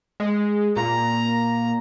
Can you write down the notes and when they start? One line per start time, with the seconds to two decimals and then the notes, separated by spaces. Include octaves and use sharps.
0.20 G#3
0.76 A#2 A#5